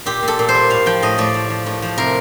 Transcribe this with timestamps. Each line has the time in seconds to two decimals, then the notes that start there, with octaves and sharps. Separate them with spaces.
0.06 A#2 G4
0.22 A#2
0.28 A4
0.39 A#2
0.49 C5
0.55 G3
0.70 A2 F5
0.86 F3 G5
1.02 A2 D#5
1.18 A2 D5
1.34 F3
1.50 F3
1.66 A2
1.82 F3
1.98 C3 A#4